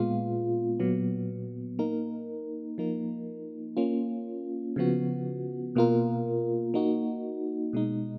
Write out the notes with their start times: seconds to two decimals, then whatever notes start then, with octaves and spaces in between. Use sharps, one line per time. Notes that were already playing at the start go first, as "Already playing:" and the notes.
Already playing: A#2 G#3 B3 F4
0.80 A#2 F#3 B3
1.79 A#3 D#4 A#4
2.78 F3 A#3 D#4 A#4
3.77 A#3 C#4 F4
4.76 C#3 F3 B3 F#4
5.75 B2 A#3 F4 A#4
6.74 A#3 D#4 F#4
7.73 B2 G#3 D#4